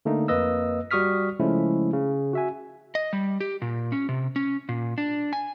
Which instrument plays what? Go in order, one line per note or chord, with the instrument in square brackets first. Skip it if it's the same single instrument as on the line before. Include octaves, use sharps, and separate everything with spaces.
[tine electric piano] D3 A3 A#3 D#4
F2 A#3 B4 D#5 E6
G3 F#4 C#6 D#6 F6 B6
C#3 F3 G#3 A3 C#4 E4
C#3
F#4 E5 G#5
[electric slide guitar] D#5
G3
G4
A#2
C#4
C3
C#4
A#2
D4
G#5